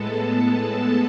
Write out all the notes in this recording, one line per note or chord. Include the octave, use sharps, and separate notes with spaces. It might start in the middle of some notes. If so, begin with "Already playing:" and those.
Already playing: A2 G#3 B3 A4 A5
A4 A5